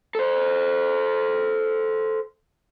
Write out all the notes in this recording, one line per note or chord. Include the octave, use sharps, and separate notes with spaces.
A4 C5